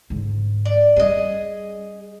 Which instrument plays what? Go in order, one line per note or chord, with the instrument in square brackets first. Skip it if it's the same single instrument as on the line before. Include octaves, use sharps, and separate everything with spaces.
[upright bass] G#2 D3
[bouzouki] D5
[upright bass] G3 C#4 [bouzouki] G#4 D#5